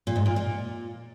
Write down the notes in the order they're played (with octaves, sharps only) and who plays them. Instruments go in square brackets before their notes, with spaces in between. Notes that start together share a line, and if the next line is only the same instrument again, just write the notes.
[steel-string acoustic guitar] A#2
G#2
A#2
A#2